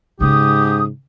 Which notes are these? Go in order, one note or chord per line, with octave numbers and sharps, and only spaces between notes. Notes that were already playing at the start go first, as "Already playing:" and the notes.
G#2 C#3 C#4 G4 D#6